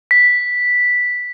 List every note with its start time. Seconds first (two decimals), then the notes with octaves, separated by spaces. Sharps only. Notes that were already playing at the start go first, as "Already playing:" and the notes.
0.11 B6